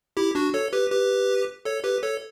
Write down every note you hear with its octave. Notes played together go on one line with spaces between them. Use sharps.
E4 G4
D4 F#4
A4 C#5
G4 B4
G4 B4
A4 C#5
G4 B4
A4 C#5